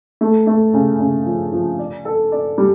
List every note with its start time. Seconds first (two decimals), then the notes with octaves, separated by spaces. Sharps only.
0.21 A3
0.47 A3
0.74 C#3
1.00 C#3
1.26 F3
1.52 F3
1.79 D5
2.05 A4
2.32 D5
2.58 G3